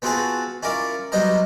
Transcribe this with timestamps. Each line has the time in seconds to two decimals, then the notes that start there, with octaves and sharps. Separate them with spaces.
0.02 B3 C4 F4 F#4 G#4 A5
0.63 C#4 E4 F4 A#4 D5
1.12 F#3 G3 B3 C5 D#5 A#5